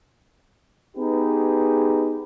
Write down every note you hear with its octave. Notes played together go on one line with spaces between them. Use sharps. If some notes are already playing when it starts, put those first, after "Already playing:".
B3 D#4 G4 G#4 B4